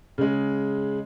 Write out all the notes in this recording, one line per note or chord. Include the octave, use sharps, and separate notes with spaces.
C#3 G#3